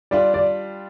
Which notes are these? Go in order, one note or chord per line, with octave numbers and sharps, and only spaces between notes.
G3 D4 F4 D5
D5